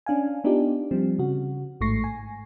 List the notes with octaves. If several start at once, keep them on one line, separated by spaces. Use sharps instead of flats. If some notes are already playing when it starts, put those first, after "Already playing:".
C#4 D4 F5 G#5
B3 D4 D#4 F4 G4
F3 G3 C4
C#3 F#4
A1 G#2 A3 C#6 A#6 C7
G#5